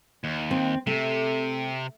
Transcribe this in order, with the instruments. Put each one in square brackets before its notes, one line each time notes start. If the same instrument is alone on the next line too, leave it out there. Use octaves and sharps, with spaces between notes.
[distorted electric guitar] D#2
[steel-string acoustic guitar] C4
[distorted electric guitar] C3 [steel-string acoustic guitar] A3